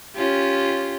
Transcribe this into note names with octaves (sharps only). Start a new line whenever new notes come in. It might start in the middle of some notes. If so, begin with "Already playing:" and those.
C#4 F4 G4